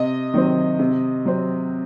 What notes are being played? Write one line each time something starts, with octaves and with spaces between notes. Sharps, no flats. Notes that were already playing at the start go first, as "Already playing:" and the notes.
Already playing: C3 D#5
D#3 F#3 C4
C3
F#3 C4